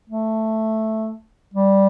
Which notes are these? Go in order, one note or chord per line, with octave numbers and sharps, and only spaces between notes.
A3
G3